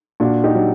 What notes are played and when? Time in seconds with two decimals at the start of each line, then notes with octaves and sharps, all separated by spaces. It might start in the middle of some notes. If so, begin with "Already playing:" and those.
0.20 A#2 D4 F#4
0.44 D#4 G4
0.55 F#3